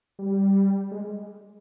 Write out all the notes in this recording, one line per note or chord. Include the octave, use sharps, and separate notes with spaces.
G3
G#3